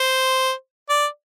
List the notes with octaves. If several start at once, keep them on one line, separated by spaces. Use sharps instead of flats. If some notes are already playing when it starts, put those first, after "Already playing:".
Already playing: C5
D5